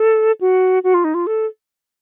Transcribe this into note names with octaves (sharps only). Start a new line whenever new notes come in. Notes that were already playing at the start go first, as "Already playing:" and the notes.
Already playing: A4
F#4
F#4
F4
D#4
F4
A4